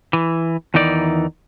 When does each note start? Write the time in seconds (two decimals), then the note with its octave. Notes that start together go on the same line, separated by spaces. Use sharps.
0.13 E3
0.74 E2 D#3 E3 D#4 D5